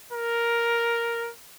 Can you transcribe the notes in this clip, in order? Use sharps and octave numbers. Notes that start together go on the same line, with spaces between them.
A#4